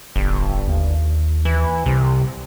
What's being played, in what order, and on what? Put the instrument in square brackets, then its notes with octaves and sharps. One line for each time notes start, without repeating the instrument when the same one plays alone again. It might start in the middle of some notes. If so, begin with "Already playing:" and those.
[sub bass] D1 [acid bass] G1
[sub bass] D#2
[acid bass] E3
[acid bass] C2 [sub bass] C3